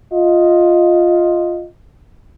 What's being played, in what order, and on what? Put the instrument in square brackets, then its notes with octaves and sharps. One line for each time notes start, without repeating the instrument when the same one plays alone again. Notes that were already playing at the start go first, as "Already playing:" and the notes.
[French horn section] F4 D#5